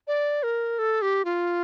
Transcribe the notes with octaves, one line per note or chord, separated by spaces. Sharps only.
D5
A#4
A4
G4
F4